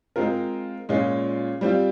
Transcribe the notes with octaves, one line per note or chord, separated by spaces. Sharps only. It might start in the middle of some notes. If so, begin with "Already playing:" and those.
G#3 C4 F4 A#4
A#2 G#3 C#4 F4
G3 C4 F4